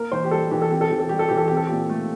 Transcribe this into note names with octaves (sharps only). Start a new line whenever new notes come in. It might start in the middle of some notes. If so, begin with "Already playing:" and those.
Already playing: A#3 A#4
E3 C5
G4
G3 A4
E3 G4
A4
C4 G4
A4
E3 G4
A4
G3 G4
A4
E3 G4
A4
C4 G4
A4
A#2 G4
A3